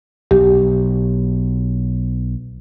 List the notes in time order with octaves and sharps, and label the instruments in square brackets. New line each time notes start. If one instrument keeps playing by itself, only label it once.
[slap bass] B1 [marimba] G4